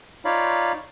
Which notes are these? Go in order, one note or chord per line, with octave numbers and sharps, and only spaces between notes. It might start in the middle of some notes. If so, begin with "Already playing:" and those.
D#4 F4 C#5 D5 F5 B5